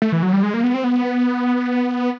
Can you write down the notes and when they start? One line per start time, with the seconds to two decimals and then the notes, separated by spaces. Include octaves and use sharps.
0.02 A3
0.12 E3
0.23 F#3
0.33 G3
0.43 G#3
0.54 A#3
0.64 B3
0.74 C4
0.84 B3